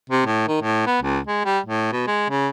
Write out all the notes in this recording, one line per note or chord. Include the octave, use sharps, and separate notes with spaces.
C3
A2
D#3
A2
B3
C#2
G#3
G3
A2
B2
G#3
C#3